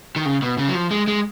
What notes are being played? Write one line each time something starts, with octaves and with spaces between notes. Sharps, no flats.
D#3
C#3
B2
C#3
F#3
F3
G#3
G#3